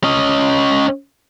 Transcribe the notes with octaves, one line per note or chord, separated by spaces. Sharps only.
C#4 D#5